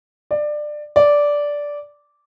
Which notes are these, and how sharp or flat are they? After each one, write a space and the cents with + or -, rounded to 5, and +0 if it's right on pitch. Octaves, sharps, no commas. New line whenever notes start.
D5 +20
D5 -10